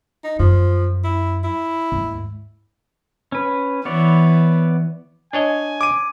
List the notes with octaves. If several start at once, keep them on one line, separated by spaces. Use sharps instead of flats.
D#4
F#2 F3
E4
E4
D#2 G#2
C#4 B4
E3 B3 C#5 D5
D4 C#5 D#5 G#5
D6 D#7